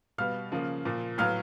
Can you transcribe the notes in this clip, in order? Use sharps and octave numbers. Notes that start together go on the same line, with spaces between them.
B2 G3 B3 F5 F6
C#3 F3 A#3
A#2 F3 A#3
A2 F#3 B3 F5 F6